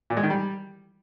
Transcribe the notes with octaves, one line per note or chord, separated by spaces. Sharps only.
A#2
G#3
D#3
G3